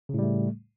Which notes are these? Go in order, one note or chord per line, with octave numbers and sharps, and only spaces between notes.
A2 C#3 G3 A3